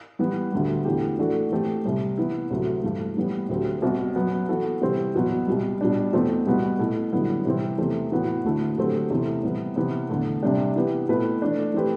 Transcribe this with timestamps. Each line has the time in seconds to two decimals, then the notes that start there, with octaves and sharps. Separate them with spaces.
0.19 E3 G3 B3
0.52 D2 D3 G3
0.85 E2 D3 A3 E4 G4
1.19 E3 A3 D4 F#4 A4
1.52 E3 A3 C4 G4
1.85 C2 C3 G3
2.17 E3 B3 E4
2.50 D2 C3 F#3 A3
2.83 G2 E3 A3
3.17 A2 E3 G3 B3
3.49 D2 D3 F#3 C4 G4
3.82 C2 B2 G3 C4 F#4
4.15 F#2 F#3 B3
4.49 E3 B3 F#4 A4
4.81 C3 E3 G3 C4 G4
5.15 E2 B2 F#3 B3
5.47 C2 B2 G3
5.81 B2 G3 D4
6.13 E2 B2 A3 C4
6.47 C2 B2 G3 B3 F#4
6.79 B2 A3 E4
7.12 F#2 D3 G3 B3 E4
7.45 C3 E3 G3 C4
7.78 E2 C3 E3 A3
8.12 A2 E3 B3 F#4
8.44 D2 D3 A3 E4 A4
8.77 D3 F#3 A3 C4 G4
9.11 E2 C3 E3 A3 E4
9.43 C3 E3 G3 B3
9.76 C3 E3 B3
10.09 E2 D3 A3
10.42 C2 C3 G3 D4 G4
10.76 E3 B3 E4 G4 B4
11.09 B2 A3 C4 E4 B4
11.42 E3 A3 D4
11.74 E3 A3 C4 G4 B4